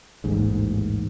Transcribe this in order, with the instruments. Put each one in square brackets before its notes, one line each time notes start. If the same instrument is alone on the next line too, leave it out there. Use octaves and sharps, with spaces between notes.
[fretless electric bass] A1 D#2 G#2